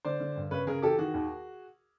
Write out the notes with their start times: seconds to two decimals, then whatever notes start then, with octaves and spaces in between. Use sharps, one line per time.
0.05 D3 C5 D5
0.20 D3
0.36 G2
0.51 C#3 B4 C#5
0.67 C#3 G#4 A#4
0.82 E3 G4 A4
0.98 D#3 F#4 G#4
1.14 D#2